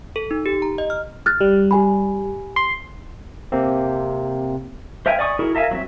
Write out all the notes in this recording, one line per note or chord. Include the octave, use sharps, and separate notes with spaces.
A4
D#4
G4
A#5
D#5
F6
F6 F#6 A6
G3
G4 G#5 B5
C6
C3 A#3 C4
C5 E5 F5 G5 G#5
D5 D#5 G#5 C#6 D#6
E4 F#4 G#4 A#4
A#4 E5 F5 G#5
F#3 C4 E5